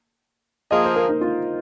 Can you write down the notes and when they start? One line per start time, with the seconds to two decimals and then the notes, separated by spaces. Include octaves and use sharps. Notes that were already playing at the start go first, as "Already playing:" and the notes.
0.71 F3 A#3 F4 G#4 D#5
0.84 C5
0.96 A#4
1.09 D#4
1.21 F4